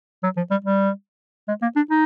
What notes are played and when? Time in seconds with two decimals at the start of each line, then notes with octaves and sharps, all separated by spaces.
0.23 F#3
0.37 F3
0.51 G3
0.65 G3
1.48 G#3
1.62 A#3
1.76 D4
1.91 D#4